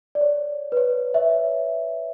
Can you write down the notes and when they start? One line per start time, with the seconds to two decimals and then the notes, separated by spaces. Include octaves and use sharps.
0.15 D5
0.21 C#5
0.72 B4
0.77 C#5
1.14 C#5 E5